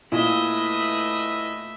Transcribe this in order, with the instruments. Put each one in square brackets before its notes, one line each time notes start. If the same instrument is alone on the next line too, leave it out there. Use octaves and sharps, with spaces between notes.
[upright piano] A#2 [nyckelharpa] A3 E5 [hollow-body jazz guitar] E4 [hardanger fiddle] B4 D#5